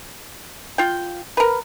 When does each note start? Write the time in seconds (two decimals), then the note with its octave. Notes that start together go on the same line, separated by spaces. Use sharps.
0.78 F4 G5
1.37 A#4 B4